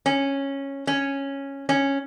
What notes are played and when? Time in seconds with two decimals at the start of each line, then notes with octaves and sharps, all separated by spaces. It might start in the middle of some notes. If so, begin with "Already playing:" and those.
0.06 C#4
0.87 C#4
1.69 C#4